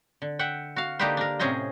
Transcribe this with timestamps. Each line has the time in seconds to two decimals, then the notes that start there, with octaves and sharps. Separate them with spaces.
0.22 D3
0.39 E5 F#5 G5
0.76 F#4 F5
0.99 D3 A#3 D#4 G4 B4 C5
1.17 D4 A#4
1.39 A2 C3 C#4 G#4 C5 D#5